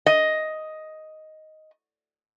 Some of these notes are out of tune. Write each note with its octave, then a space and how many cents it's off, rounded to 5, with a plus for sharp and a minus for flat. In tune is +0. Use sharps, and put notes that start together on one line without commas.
D#5 +5